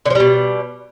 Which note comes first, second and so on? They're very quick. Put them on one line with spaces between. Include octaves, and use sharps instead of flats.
D3 F3 G3 B2